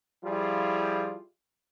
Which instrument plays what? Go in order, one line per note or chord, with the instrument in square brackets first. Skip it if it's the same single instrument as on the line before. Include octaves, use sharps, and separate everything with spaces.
[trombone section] F3 G3 E4 F4 G#4